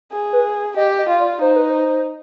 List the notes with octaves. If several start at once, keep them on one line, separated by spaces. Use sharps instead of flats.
G#4
B4
G4 D#5
D#5
F4
D5
D#4 C5
B4
C5